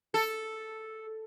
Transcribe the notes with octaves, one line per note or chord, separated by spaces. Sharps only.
A4